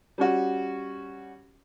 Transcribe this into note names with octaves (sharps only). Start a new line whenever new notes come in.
G3 C#4 F#4